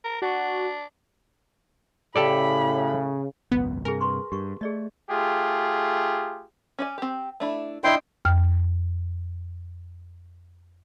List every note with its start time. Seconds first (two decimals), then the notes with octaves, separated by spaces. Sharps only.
0.04 A#4
0.22 D4 F#4
2.16 A2 C#3 G4 A4 D5 B5
3.52 G#1 C#2 F#2 B3
3.85 G2 C3 G#4 A#4 G#5
4.01 B4 C6 C#6
4.32 G2 G4 C#6
4.61 A3 G#4 D5 D#5
5.10 A3 F4 G4 G#4
6.79 C#4 D5 G#5
6.98 C4 G4
7.40 A3 D4 E4
7.84 D4 E4 D#5 G5 C6
8.25 F2 G5 F6